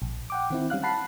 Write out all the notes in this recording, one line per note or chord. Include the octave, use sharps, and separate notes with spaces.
A#1
F#5 G5 D6
D#3 C4 E4
G3 C#4 F5 F#6
F#5 A5 B5 F#6 C7